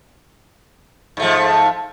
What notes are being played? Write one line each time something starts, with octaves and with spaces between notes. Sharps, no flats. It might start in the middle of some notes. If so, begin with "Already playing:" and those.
G#2 F3 A3